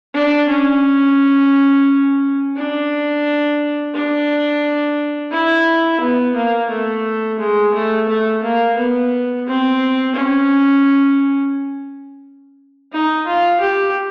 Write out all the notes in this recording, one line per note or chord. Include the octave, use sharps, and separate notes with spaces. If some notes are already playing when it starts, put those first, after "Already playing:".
D4
C#4
D4
D4
E4
B3
A#3
A3
G#3
A3
A3
A#3
B3
C4
C#4
D#4
F4
G4